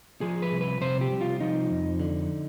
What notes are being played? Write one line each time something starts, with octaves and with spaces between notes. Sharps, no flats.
F3 G#4
B4
C2
B4
C3 C5
G4
C2
F4
F3 D#4
F2
D3